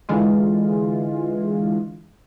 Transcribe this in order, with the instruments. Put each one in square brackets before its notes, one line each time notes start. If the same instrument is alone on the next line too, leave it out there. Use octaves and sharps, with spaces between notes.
[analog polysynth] D3 E3 G#3 F4